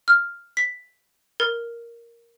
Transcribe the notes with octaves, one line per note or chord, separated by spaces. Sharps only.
F6
B6
A#4